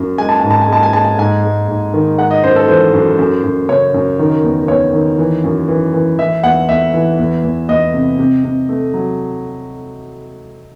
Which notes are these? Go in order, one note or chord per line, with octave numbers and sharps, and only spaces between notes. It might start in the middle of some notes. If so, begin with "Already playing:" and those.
Already playing: F#2
G#3 G#5
A5
G#2 G#5
A5
G#5
G#3 A5
G#5
G#3 A5
G#5
G#2 G#5
G#3
G#2
D#3
G#3 F#5
D#5
F#2 C5
A4
E3 C5
F#2
F#2
F#2
C#3 C#5
F#2
D#3
E2
E2 C#5
D#3
E3
F#2
E3
E3
E3 E5
E2 F#5
E2 E5
E3
E2
E2
E2 D#5
C3
C3
C3
A3
F#3